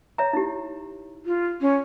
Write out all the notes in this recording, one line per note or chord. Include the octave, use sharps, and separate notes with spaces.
C#5 E5 A#5
D#4 E4 G4
F4
C#4